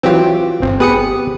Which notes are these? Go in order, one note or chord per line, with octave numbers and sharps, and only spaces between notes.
E3 F#3 C4 F4 G4
G1 C4
B3 G4 G#4 B4 D#6 C#7